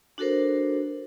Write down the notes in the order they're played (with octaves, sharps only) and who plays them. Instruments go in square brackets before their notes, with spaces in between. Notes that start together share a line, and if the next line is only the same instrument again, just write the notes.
[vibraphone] D4 F#4 A4 A#4 C5